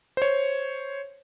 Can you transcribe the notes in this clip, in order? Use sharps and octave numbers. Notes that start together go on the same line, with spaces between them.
C5 C#5